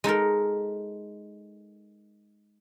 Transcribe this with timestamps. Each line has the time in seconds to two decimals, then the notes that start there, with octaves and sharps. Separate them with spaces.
0.04 G#3 D#4 A4 A#4